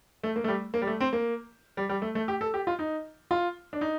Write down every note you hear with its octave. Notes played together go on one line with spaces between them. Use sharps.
A3
A#3
A3
G3
A#3
G3
A3
C4
A#3
G3
G3
A3
A3
G4
A4
G4
F4
D#4
F4
D4
D#4